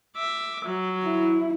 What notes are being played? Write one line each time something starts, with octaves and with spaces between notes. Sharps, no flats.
E5 D6
F#3
E4